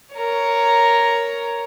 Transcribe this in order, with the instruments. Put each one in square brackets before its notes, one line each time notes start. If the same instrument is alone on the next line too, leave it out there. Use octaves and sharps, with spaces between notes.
[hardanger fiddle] A#4 C#5